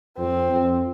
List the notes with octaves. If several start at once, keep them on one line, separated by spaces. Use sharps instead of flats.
F2 C4
F2